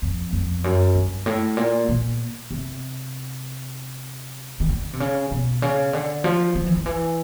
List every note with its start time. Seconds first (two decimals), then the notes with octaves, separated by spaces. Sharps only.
0.02 F2
0.33 F2
0.64 F#2
0.95 G2
1.26 A2
1.57 A#2
1.89 A#2
2.51 C3
4.60 D#3
4.69 D3
4.93 C3
5.00 C#3
5.31 B2
5.62 C#3
5.93 D3
6.24 F3
6.55 F3
6.66 E3
6.76 D#3
6.86 E3